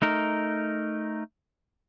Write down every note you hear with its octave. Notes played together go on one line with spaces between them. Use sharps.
A3 D#4 A#4